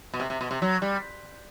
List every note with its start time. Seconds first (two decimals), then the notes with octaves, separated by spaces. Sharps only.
0.13 B2
0.20 C3
0.30 C3
0.41 B2
0.51 C3
0.62 F#3
0.82 G3